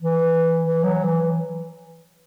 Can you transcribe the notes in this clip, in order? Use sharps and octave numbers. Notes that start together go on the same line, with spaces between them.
E3
E3
F#3
E3